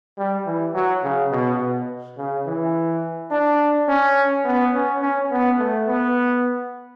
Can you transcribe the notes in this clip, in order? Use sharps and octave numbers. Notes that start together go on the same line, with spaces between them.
G3
E3
F#3
C#3
B2
B2
C#3
E3
D4
C#4
B3
C#4
C#4
B3
A3
B3